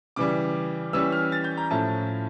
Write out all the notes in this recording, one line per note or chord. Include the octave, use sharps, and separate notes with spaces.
C#3 E3 G3 D6
E3 G3 C#4 E6
F6
A6
G6
A#5
A2 F3 C#4 E4 A5